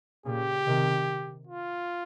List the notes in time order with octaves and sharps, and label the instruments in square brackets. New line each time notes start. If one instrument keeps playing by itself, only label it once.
[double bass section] A#2 C#3 [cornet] G4
[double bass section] C3 D#3
[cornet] F4